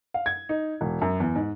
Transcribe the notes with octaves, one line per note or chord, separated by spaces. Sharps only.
F5
G#6
D#4
E1
F#2
E2
G#2